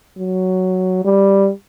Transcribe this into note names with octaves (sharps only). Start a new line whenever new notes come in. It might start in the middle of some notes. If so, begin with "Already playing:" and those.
F#3
G3